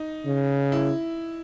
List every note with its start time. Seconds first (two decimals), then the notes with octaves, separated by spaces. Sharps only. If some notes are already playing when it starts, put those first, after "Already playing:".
Already playing: D#4
0.25 C#3
0.72 E4